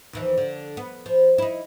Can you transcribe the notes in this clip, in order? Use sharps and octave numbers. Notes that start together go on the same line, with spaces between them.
D#2 E3 F3
D3
B3
F3
D#4 E4